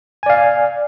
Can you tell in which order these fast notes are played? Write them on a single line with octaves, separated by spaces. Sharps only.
G#5 D5 F5